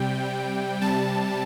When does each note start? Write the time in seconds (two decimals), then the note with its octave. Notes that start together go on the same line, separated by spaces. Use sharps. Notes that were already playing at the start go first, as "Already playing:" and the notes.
Already playing: C3 G3 G5
0.82 C3 G3 A5